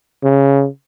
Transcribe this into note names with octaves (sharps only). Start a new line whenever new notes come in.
C#3